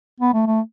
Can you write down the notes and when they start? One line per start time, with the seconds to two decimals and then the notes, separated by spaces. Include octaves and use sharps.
0.20 B3
0.33 A3
0.46 A3